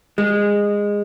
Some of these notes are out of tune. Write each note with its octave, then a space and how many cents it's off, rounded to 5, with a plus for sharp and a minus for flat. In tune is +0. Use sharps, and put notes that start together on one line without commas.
G#3 -20